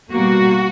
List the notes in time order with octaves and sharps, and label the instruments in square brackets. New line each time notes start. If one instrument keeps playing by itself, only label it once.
[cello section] B2 G3 A#3 F#4